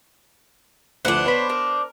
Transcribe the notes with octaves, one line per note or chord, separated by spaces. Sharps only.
D2 F3 D4 E4 B4 C5 F#5
B3 B4 C#5 B5
A#4